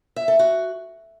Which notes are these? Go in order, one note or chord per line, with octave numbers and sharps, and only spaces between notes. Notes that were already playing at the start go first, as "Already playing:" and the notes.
E5
A4
F#4